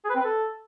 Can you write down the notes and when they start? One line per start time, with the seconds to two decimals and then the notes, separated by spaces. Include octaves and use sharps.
0.05 G#4
0.10 B4
0.15 C4
0.20 B4
0.25 A4